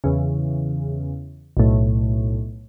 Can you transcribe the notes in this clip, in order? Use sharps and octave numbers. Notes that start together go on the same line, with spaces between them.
E2 C#3
B1 A2